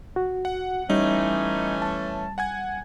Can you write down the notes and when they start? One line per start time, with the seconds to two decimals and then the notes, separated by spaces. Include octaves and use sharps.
0.16 F#4
0.45 F#5
0.90 E3 G3 A3 C#4 D#4
1.82 A5
2.38 F#5 G#5 G#6